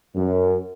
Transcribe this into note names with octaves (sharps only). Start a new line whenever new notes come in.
F#2